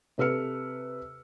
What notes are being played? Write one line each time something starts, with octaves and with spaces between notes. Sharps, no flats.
C3 A4 B4 E6 F6 C#7